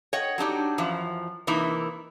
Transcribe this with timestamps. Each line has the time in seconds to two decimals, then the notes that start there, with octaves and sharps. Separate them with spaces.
0.13 C#5 D#5 F#5 G5
0.38 F#3 D4 D#4 G4
0.78 F#2 E3 F3
1.47 C3 E3 A#3 D#4 E4